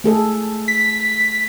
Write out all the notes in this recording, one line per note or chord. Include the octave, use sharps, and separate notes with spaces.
A3 G#4 A4
B6